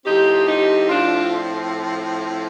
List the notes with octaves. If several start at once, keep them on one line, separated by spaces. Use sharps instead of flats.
A2 F3 C4 D#4 G4
D#4 G4
D4 F4